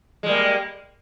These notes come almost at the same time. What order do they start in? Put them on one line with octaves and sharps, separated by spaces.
G#3 G3 A#3